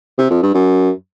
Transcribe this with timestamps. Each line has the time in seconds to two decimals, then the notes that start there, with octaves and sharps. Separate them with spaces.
0.19 C3
0.31 F2
0.43 G2
0.54 F#2